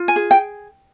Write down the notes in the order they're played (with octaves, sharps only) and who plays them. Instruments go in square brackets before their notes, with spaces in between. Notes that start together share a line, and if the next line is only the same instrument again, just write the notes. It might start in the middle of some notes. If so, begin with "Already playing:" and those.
Already playing: [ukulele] F4
G#5
G#4
G5